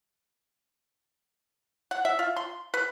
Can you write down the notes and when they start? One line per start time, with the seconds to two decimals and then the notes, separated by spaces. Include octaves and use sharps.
1.91 F#5
2.05 E5
2.19 F4
2.36 C6
2.74 B4